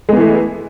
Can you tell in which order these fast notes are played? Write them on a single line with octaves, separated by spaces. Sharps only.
G#3 B3 E3 A3